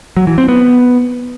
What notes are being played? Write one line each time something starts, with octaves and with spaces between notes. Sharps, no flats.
F#3
E3
C4
B3